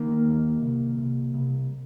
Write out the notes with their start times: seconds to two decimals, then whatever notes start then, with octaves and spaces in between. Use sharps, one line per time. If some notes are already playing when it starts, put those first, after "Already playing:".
Already playing: D#3 A#3
0.24 D#2
0.61 C2
0.98 C2
1.34 C2